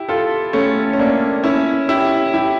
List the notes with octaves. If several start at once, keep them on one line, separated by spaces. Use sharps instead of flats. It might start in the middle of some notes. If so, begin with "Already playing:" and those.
Already playing: E4 G4
F4 A4
A3 C#4
C#4
A#3 D4
C#4 E4
E4 G4
E4 G4